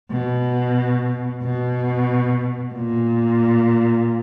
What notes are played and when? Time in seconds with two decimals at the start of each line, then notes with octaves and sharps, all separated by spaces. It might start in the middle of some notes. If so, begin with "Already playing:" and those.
0.11 B2
1.42 B2
2.74 A#2